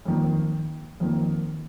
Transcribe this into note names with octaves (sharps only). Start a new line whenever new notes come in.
F2 D#3 A#3
F2 D#3 A#3